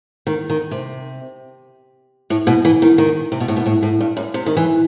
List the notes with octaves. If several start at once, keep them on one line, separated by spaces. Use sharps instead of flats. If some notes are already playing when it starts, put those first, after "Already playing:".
D#3
D#3
C3
A2
B2
E3
D#3
D#3
C3
B2
A2
B2
A2
A2
G2
F#2
C3
D#3
E3